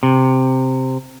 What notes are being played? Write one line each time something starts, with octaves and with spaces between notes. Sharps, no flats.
C3